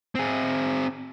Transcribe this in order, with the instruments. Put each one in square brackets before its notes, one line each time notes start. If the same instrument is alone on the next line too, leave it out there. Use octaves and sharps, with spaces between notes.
[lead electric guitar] C4 G#4